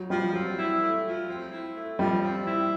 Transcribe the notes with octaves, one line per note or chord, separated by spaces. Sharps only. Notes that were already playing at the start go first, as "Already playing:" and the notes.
Already playing: F#3
F3 G3
F#3 C4
E4
A3
F3
C4
E4
A3
F3 G3
C4
E4